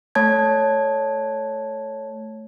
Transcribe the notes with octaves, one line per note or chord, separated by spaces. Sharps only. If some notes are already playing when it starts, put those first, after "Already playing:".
A3 C#5 A5 G#6